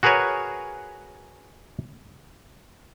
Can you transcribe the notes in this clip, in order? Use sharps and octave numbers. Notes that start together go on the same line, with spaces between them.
F#4 G#4 A#4 B4 C#5 G#5